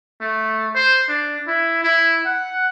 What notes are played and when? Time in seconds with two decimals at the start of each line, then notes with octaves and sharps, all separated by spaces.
0.21 A3
0.75 C5
1.08 D4
1.47 E4
1.84 E4
2.26 F#5